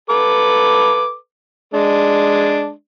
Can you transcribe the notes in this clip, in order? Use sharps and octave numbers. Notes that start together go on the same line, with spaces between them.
A4 B4 D6
G#3 D4